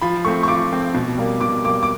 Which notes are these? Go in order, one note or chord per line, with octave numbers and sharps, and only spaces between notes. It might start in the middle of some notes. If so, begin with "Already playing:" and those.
F3 B5
A3 C4 C#6
C#6
F3 D6
A3 C4
B2
G3 A#3
B2 D6
G3 A#3 D6
D6